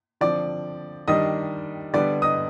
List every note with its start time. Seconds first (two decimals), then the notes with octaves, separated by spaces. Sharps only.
0.21 D3 F3 C4 D5 D6
1.08 D#3 G3 D4 D#5 D#6
1.94 D3 G3 B3 D5 D6
2.22 D#5 D#6